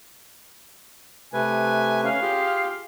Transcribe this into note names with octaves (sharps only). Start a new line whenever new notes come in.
C3 A3 B4 G#5
C#4 F5
F4 G4 G#4